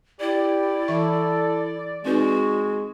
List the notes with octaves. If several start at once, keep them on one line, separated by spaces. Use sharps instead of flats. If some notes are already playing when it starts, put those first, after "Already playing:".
E4 G4 D5
E3 A4 E5 C#6
G#3 C4 D#4 F#4 B4